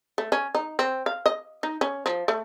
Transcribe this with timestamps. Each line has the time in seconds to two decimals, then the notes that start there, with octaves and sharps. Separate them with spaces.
0.18 A3
0.32 C#4
0.55 D#4
0.79 C4
1.06 F5
1.26 D#5
1.63 D#4
1.81 C#4
2.06 F3
2.28 A3